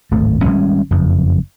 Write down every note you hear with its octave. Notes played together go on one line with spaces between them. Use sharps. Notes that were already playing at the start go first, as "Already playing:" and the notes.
D1 G#1 A3
G#1 D2 G3 C#4
F#1 F2